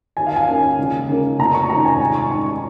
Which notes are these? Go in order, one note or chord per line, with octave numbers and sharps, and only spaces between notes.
D#2 G#5
F5
G#5
D#3 A#3 C#4
C#2
C#3 A#3 C#4
F1 A#5
C#6
D#2 D#3 C#4 A#5
G#5
G#2 G#5
C#6
D#3 C#4 C#6
C#6